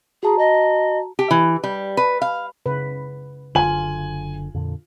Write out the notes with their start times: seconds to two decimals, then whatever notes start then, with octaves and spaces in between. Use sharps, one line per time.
0.23 F#4 G#4 A5 A#5
0.38 D#5
1.19 G4
1.31 E3
1.64 G3
1.97 B4
2.22 F5
2.66 C#3 B4
3.55 F#1 D3 F4 G#5 F#7
4.54 F2 A#2 D3